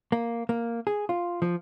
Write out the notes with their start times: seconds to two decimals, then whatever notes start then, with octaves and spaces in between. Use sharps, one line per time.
0.12 A#3
0.49 A#3
0.87 G#4
1.09 F4
1.42 F3